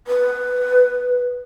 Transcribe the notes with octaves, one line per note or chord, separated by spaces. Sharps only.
B4